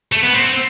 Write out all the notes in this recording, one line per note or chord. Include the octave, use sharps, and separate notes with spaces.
A3
B3
C4